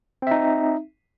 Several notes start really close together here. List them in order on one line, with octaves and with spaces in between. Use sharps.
C4 E5 D#4